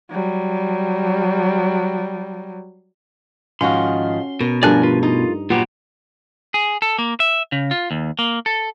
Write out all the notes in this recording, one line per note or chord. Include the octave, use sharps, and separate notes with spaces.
F#3 G3
G#2 D#3 F3 C#4 F#4 C6
B2 A#4
G2 F3 A3 A#4 D5 G#5 F#6
F4 B4
D#4 F4
A#2 F#3 B3 F4 G4
G#4
A4
A#3
E5
C#3
F4
D#2
A#3
A4